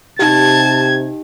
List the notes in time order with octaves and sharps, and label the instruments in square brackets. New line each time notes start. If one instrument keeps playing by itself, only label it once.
[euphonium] C3 [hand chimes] D#4 G4 [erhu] A5 [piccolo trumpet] G#6